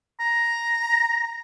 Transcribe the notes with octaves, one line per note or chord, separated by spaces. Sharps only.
A#5